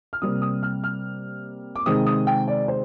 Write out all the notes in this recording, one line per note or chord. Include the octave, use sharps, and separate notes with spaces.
F6
C3 G3 A#3 D#6
D#6
F6
F6
D6
C3 D#3 G#3 C4 D#6
D#6
G5
D5
C5